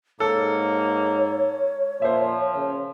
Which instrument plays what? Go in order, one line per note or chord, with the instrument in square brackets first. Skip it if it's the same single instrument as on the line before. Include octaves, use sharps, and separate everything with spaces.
[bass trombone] G#2 [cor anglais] A#3 [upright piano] A4 [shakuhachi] C#5
[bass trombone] A#2 [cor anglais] F3 [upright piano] C5 E5
[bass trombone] C#3